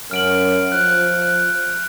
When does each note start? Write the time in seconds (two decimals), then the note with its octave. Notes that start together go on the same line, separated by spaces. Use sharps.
0.11 F#2 F6 D7 F#7
0.72 F3 F#6
1.22 F#6